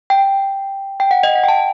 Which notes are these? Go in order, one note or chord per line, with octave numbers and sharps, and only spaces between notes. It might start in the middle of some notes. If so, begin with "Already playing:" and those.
G5
G5
F#5
D#5
F#5
G5
A5